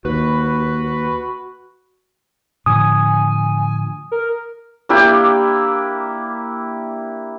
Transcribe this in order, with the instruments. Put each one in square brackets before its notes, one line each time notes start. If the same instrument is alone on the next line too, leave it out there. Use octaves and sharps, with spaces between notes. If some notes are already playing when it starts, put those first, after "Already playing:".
[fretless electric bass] D#2 [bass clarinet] F#4 [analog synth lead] B4
[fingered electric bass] A2 D3 F3 [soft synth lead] G#5 [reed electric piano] D#6
[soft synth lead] A#4
[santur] A#3 D4 E4 G4